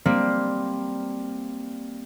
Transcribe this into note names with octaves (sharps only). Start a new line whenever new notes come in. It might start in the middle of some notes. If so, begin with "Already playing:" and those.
G3 A#3 C4